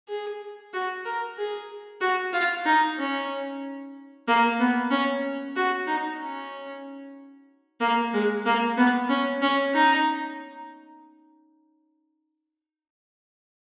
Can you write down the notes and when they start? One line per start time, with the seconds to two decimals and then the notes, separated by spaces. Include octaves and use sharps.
0.09 G#4
0.73 F#4
1.05 A#4
1.38 G#4
2.01 F#4
2.33 F4
2.66 D#4
2.98 C#4
4.27 A#3
4.60 B3
4.91 C#4
5.56 F#4
5.87 D#4
6.20 C#4
7.80 A#3
8.13 G#3
8.46 A#3
8.77 B3
9.09 C#4
9.42 C#4
9.74 D#4